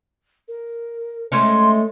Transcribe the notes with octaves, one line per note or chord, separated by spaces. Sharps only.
A#4
G#3 A3 C#4 C6